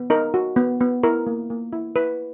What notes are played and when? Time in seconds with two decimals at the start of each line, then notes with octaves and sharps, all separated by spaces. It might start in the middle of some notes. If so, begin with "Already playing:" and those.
Already playing: B3
0.10 D#4 A#4
0.34 F#4
0.56 B3
0.80 B3
1.03 E4 A#4
1.27 A#3
1.50 A#3
1.73 E4
1.96 E4 B4